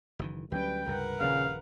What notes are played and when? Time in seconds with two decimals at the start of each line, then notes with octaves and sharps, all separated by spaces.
0.19 F#1 D#3 E3
0.52 D2 F#3 G3 C#4 B4 G5
0.87 C#2 G2 C3 A#4 B4 F#5
1.20 D#1 A#1 C#3 F5